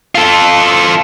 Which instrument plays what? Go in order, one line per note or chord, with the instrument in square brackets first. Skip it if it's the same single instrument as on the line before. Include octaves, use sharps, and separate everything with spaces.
[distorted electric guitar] F4 A4